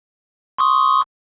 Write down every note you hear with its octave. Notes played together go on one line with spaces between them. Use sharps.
C6 C#6 D#6